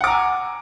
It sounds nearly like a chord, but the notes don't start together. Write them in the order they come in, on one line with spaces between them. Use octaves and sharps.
F#5 D6 A#5 G#5